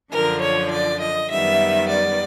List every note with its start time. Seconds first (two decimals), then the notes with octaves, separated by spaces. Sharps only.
0.12 F#2 D3 F3 A#4
0.41 C#5
0.72 D5
1.01 D#5
1.30 F#2 D#3 G3 B3 E5
1.90 D5